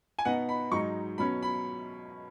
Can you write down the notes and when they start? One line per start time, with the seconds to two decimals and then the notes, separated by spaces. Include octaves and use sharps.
0.19 G#5
0.25 B2 B3 D#4 F#5
0.49 B5
0.71 G#2 F#3 D#4 C#6
1.18 B2 F#3 C#4 B5
1.43 B5